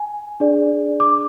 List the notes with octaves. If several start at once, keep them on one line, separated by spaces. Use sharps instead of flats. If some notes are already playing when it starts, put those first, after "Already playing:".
Already playing: G#5
D4 G#4 D5
D6